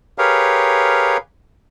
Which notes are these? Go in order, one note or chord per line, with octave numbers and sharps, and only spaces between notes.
G4 G#4 A#4 B4 C#5 F5